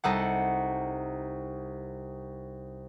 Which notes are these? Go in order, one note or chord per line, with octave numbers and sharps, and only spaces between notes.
C2 D#4 A4 F#5